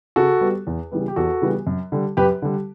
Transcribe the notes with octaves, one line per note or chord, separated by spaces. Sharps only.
C#3 F#4 A4
G3 B3
E2
C#3 E3 G3 B3
G4
E2 F#4 A4
C#3 E3 G3 B3
F#2
D3 G3
F#2 G4 B4
D3 G3